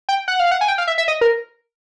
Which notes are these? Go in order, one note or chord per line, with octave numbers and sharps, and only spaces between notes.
G5
F#5
F5
F#5
G#5
G5
F5
E5
E5
D#5
A#4